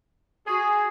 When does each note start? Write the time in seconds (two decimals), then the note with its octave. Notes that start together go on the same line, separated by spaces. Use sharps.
0.46 F#4 G#4